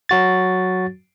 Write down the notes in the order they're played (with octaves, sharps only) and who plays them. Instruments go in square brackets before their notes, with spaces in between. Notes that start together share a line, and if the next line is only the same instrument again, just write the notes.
[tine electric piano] F#3 F#4 A6